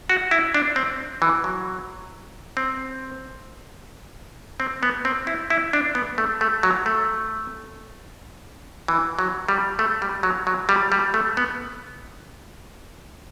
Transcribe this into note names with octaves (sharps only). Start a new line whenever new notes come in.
F#4
E4
D4
C4
E3
F#3
C4
C4
B3
C4
E4
E4
D4
B3
A3
A3
F#3
A3
E3
F#3
G3
A3
G3
F#3
F#3
G3
G3
A3
B3